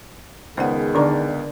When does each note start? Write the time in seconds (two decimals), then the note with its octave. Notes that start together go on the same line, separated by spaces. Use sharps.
0.57 C#2 D#3 B3 G#4 C5 D5 F#5
0.95 D3 D4 A#4 D5 A#5